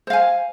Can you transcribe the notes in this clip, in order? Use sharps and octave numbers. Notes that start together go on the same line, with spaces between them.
C5 F5 G#5